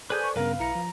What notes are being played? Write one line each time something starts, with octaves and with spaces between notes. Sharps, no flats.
G#4 A4 B4 C5 D5 G#5 G6
C#6
G2 C#3 B3 A#4 B4 F5
B1 E4 A#5 C#7
F3